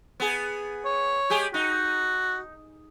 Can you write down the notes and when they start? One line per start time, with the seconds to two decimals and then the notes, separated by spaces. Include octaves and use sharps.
0.20 B3 G#4
0.85 C#5
1.30 G#3 G4 G#4
1.54 D#4 F#4